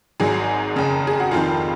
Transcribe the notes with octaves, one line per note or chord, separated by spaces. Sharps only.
G#1 G#2 F#3 G#4
F#1 F2 C#3
G#4
F#4
F1 F2 D#3 F4